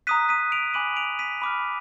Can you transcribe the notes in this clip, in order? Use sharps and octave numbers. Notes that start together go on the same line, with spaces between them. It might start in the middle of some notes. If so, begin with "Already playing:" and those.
A#5 D#6 F#6 B6 D#7
B6 D#7
D7 F7
G#5 B5 D6 F#6 D#7 F#7
D7 F7
B6 D#7
B5 D6 F6